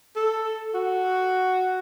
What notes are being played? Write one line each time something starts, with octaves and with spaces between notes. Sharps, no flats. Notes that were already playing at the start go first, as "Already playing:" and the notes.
A4
F#4